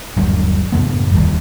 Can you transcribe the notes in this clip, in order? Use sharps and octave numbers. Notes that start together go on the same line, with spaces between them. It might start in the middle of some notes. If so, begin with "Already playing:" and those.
G1 D#2 F#3 G3
F#2 A2 C#3 B3
D1 A#1 D#2 G3